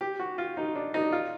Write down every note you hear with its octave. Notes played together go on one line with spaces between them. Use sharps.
G4
F#4
F4
D#4
D4
D#4
F4